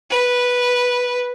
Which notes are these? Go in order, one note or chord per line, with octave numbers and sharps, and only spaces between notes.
B4